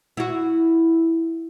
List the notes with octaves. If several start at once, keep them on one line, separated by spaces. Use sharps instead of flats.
E4 F#4